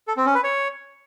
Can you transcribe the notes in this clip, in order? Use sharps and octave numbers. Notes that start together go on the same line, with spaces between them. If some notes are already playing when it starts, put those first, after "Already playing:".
A4
C4
C#4
B4
C#5